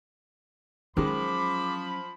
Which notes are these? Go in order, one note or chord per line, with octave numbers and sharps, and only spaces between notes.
D#3 F3 F#3 G#3 C#4 B5 D6